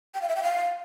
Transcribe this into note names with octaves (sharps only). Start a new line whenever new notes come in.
G5
F5
E5
G5
F5